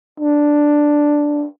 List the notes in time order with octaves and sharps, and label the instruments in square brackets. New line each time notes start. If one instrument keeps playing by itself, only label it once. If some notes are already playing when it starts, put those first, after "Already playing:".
[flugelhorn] D4